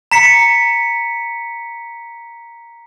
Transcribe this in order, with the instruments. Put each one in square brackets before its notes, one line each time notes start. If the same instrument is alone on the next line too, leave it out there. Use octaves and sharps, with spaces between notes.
[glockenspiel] A#5 B6 C#7